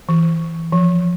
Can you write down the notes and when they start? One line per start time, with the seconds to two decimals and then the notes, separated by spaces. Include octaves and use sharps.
0.09 E3
0.72 F3